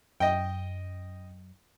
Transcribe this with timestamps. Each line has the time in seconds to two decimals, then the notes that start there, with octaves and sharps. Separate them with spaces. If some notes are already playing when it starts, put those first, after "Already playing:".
0.20 F#2 D#5 G5